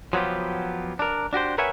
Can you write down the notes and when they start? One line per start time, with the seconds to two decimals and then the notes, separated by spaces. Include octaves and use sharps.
0.13 F3 F#3 B3 F4 G4
0.99 D4 A#4
1.33 D4 F#4 G4 C5
1.58 A#4 B4 C#5 E5 F#5 G#5